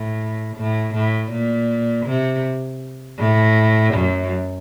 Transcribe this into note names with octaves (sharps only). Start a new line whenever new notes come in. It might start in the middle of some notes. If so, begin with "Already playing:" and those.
Already playing: A2
A2
A2
A#2
C3
A2
F#2